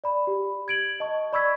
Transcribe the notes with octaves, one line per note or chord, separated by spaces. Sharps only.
D5 B5
G4
G#6 D7 F#7
D#5 A5 C#6
D5 B5 C#6 E6 G#6 B6